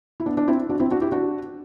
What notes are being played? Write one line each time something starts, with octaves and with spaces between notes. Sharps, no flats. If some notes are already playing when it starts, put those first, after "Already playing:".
E4
B3 D4
D4
C4 E4
D4 F#4
C4 E4
D4 F#4
E4 G4
D4 F#4